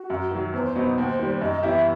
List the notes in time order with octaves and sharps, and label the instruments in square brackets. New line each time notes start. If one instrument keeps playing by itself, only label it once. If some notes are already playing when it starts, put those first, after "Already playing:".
Already playing: [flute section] F#4
[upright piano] F#2
D#3 F#3
[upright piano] E2 [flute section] C5
[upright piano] B2 F#3 B3 D#4
D#2
D#3 G3
[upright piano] F#2 [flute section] D#5
[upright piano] E3 B3 E4 G4 [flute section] E5